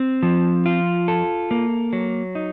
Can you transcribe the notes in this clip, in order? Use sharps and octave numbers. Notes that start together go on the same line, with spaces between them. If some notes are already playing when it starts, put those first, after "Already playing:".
Already playing: C4
F3
F4
A4
A#3
F#3
D#4